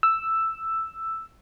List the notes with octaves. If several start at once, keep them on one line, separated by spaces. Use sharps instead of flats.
E6